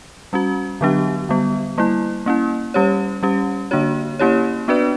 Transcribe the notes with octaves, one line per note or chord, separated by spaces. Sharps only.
G3 C#4 F#4
D3 F#3 B3 D4 G4
D3 G3 B3
G3 A#3 E4
A#3 C#4 E4
G3 C#4 G4 C#5
G3 C#4 G4
D3 A#3 D4 F#4 C#5
A#3 C#4 E4 G4 C#5
B3 D4 F#4 B4 D5